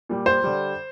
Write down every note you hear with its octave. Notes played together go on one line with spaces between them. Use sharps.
A#2 G3
C5
D3 G3